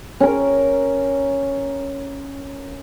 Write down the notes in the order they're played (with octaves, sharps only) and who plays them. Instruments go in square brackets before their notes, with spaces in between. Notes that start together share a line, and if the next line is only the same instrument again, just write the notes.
[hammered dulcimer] C#4 A#4